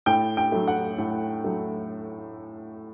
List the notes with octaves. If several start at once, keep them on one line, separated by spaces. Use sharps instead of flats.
A2 G5
G5
F#3 A3
F#5
A2
F#3 A3